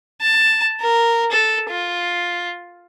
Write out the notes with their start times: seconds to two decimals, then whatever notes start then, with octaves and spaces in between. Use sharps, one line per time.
0.21 A5
0.80 A#4
1.32 A4
1.70 F4